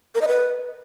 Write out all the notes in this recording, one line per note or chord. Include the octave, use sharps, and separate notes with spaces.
A#4
D#5
B4